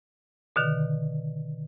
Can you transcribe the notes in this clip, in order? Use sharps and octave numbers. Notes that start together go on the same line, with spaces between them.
B2 D3 D#3